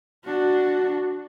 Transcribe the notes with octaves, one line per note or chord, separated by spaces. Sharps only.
D4 F#4